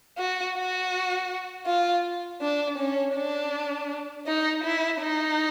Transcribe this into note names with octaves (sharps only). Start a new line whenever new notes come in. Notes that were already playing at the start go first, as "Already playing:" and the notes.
F#4
F#4
F4
D4
C#4
D4
D#4
E4
D#4